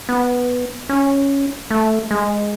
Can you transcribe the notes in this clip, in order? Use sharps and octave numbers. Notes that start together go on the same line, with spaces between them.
B3
C#4
A3
G#3